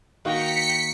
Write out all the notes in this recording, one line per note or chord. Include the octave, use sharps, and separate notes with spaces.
D#3 A#3 F#4 G5 A#5 B6 C#7